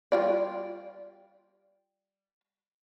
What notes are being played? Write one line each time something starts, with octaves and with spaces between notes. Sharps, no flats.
G3 F4 D5